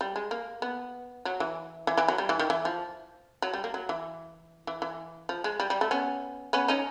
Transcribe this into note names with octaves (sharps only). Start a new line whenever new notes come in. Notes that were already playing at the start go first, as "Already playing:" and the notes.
G3
G#3
A#3
B3
F#3
E3
E3
E3
F#3
G3
E3
D#3
E3
F3
F#3
G3
A#3
F#3
E3
E3
E3
F3
G#3
G3
G3
A3
B3 C#4
B3 C#4
C#4 D#4